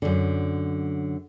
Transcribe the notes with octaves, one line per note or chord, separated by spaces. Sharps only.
F#2 D3